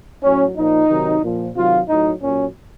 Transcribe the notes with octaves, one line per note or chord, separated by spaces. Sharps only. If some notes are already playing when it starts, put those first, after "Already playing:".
A2 F#3 C#4
A#2 F3 D#4
C3 D#3 F#3
A#2 F3
C3 D#3 F#3 F4
A2 F#3 D#4
A#2 F#3 C#4